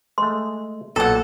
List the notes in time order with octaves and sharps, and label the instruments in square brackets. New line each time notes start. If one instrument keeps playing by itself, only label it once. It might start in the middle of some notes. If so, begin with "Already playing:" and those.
[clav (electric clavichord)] G#3 A3 [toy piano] C6
[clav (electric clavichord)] B1 A#2 F#3 [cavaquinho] A4 F#5